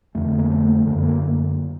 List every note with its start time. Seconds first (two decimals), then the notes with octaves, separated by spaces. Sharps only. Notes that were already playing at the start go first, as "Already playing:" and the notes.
0.15 F2 D3 A3
0.39 A#3
0.50 A3
0.85 F#2 D3 A3
1.03 A#3